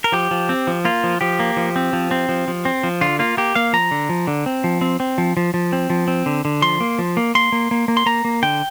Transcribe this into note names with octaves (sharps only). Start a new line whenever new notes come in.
A#4
F3 G4
F3
C4
F3
A#3 F4
F3
F3 G4
A#3
F3
C4
F3
C4
F3
F3
C4
F3
D3 F4
A#3 F4
A#3 G4
A#3 F5
F3 A#5
D3
F3
D3
C4
F3
C4
C4
F3
F3
F3
C4
F3
C4
D3
D3
F3 C6
A#3
F3
A#3
A#3 C6
A#3
A#3
A#3
C6
A#3 A#5
A#3
D3 G5